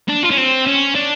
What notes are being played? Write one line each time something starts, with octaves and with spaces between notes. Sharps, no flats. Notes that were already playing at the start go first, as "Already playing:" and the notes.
D4
F4
C#4
C4
C#4
D4